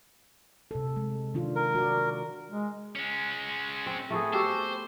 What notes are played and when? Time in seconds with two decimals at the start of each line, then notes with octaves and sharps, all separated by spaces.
0.71 C3 A4
0.96 G#3
1.34 D#3 D4 F4
1.56 A#4
1.75 F#4 D5
2.51 G#3
2.95 G#3 C#4
3.86 C4
4.10 A3 B3 G#4
4.33 F#4 G4 A4 C5